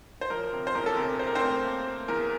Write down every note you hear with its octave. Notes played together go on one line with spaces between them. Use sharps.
C5
F3 A#4
C3
C5
E2 A#4
A4
C3 A#4
C4 C5
A#4
C4 C5
A3
A#3
A#3
E2 A#4